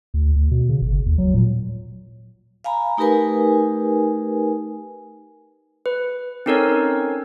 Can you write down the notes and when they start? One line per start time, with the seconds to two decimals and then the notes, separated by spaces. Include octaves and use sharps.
0.14 D2
0.36 D2
0.51 B2
0.69 C#3
0.82 G1
1.06 D#2
1.18 F#3
1.34 A#2
2.64 F5 G#5 A#5 B5
2.97 A3 D#4 G4 A#4 B4 G#5
5.86 B4
6.46 C4 C#4 D#4 A4 A#4 C#5